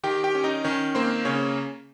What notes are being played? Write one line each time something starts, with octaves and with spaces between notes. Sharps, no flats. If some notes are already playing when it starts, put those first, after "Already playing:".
D#3 G4 G5
G4 G5
C#4
D#4 D#5
D#3 C#4 C#5
A#3 C4 C5
C#3 C#4 C#5